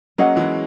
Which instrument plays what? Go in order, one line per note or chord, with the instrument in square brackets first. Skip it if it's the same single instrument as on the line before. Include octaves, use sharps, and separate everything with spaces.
[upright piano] F#3 A#3 [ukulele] C#4 G#4 D#5 F#5
[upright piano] E3 G#3